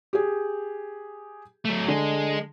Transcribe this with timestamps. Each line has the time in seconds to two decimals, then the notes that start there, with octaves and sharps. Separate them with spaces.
0.13 G4 G#4
1.65 F#3 A3
1.88 D3 G#3 G#4